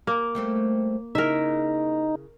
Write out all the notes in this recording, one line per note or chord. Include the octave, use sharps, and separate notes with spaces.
A#3 A#4
G3 A3 C4
C#3 D#4 E4 A#4 E5